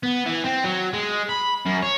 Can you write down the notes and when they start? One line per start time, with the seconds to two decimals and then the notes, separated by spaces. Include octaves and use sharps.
0.03 B3
0.26 E3
0.44 C4
0.65 F#3
0.93 G#3
1.29 B5
1.66 F#2
1.83 C#5